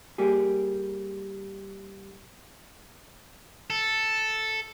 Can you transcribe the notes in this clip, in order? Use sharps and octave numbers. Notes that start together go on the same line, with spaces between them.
G3 A#3 G4 G#4
A4